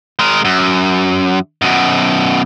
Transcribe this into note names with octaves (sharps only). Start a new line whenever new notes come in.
G#3 A#4
F#2
F#2 B2